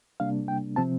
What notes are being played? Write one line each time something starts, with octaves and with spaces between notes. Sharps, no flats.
C3 G3 A#3 D4 F5
G5
C3 F3 C4 A5